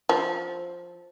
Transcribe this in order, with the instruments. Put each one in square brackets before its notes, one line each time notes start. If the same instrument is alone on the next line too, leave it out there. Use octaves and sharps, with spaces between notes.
[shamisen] F3